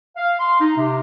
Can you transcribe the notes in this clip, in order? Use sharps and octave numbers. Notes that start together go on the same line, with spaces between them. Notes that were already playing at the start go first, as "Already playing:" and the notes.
F5
C6
D#4
C3